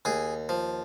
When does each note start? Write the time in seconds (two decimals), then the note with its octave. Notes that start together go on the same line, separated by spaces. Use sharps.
0.05 D#2 G#4
0.49 F3